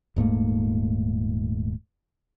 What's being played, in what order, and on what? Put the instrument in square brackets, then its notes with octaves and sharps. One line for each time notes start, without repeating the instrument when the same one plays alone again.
[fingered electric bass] D#1 G#2 A3 A#3